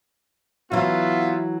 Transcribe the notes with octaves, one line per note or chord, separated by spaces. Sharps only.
E3 F#3 B3 F4 E5